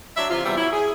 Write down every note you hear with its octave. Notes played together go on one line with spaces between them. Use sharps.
F#3 D4 E5
C3 E3 F4
E2 C3 G3 E5
F#3 E4
G#4